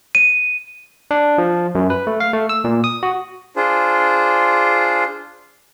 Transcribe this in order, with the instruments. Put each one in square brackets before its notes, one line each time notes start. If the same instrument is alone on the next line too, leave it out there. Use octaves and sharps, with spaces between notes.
[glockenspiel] D#7
[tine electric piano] D4
F3
F#2
B4
A3
F5
A3
E6
A#2
D#6
F#4
[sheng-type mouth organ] D4 F4 G#4 C5